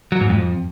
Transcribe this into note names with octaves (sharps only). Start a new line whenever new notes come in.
F#3
G#2
F2